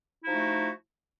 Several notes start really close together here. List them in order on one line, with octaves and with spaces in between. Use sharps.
E4 F3 D#4 F#4 A3